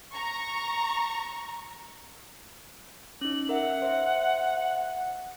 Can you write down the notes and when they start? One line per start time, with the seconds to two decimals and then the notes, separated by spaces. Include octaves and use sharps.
0.12 A#5 C#6
3.21 C#4 D#4 F#7
3.49 A#4 E5 F#5
3.82 C5 E5